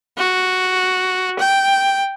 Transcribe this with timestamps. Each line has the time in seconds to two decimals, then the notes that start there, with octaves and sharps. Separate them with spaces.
0.18 F#4
1.39 G5